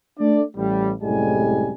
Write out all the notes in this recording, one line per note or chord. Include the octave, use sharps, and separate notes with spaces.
A3 D4 D5
A1 G3
C2 F#2 A2 G3 G#3 G#5